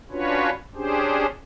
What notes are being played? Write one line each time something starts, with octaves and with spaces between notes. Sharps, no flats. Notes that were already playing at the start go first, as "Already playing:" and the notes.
C#4 D4 F4 F#4 B4 C#5
C#4 D4 G4 G#4 C5